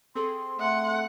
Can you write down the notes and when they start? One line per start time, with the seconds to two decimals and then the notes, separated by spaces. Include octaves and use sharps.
0.15 C4 G#4 A4 C6
0.59 A3 F#5